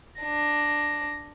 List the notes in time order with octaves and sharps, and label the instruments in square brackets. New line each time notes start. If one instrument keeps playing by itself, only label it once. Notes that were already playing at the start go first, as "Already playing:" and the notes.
[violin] D4 A#6